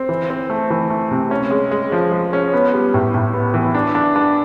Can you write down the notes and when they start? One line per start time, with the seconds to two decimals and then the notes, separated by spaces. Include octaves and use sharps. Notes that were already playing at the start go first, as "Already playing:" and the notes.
Already playing: C4
0.09 E3
0.30 C4
0.50 A3
0.70 E3
0.90 A3
1.11 C3
1.31 C#4
1.51 G#3
1.71 G#3
1.92 F3
2.12 G#3
2.33 C#4
2.53 B3
2.73 G3
2.94 A2
3.14 A2
3.34 B3
3.54 E3
3.75 D4
3.95 D4
4.16 D4